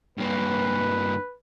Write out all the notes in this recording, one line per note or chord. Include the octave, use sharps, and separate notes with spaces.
G2 A#3 B4